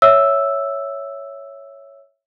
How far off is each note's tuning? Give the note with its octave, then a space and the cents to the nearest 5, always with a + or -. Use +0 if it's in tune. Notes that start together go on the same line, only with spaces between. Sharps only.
C#5 +0 E5 +0 E6 +0